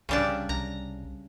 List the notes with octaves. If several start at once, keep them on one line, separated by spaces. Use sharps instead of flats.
C2 C#3 G3 D4
C2 A#5